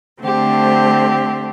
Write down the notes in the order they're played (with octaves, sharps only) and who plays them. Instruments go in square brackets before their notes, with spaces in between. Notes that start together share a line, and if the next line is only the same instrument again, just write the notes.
[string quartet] D3 A3 C4 G4 C5